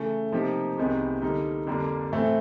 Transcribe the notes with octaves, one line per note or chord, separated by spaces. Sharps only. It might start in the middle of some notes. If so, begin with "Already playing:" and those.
Already playing: C#3 E3 A3
C3 F3 A#3 D#4 G4
C2 C3 D#3 G#3 B3
D3 G3 A#3 D#4
F2 D3 G3 A#3 D4
A2 E3 A3 C4 E4